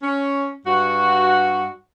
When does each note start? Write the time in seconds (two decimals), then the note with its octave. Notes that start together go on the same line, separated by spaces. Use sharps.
0.02 C#4
0.65 G2 F#4